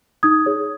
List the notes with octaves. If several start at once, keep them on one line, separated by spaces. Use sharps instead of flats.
D#4 D#6 G#6
G#4 C#5